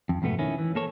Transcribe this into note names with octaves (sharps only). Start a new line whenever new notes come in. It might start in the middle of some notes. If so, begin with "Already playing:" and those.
F2
F2 G#2 B2 A3 B3
D#3 C#4 E4
E3
A#3 A4 C#5